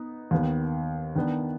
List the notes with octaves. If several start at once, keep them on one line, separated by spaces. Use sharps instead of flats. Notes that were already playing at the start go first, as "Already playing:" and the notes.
Already playing: B3 D#4
D#2 D#3 B3
D#3 B3 D4